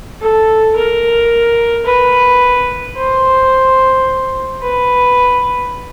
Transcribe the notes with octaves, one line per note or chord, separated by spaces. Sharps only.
A4
A#4
B4
C5
B4